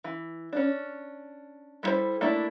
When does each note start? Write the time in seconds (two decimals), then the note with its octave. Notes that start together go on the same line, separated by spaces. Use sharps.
0.04 E3
0.53 C#4 D4
1.83 G3 B3 E4 A4 C5
2.21 A3 A#3 D4 E4